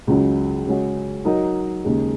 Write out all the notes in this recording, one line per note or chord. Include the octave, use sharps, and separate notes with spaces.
C#2 C#3 F#3
C#3 G#3 C#4 F#4
F#3 D#4 A#4 D#5
D#2 C#3 G#3 D#4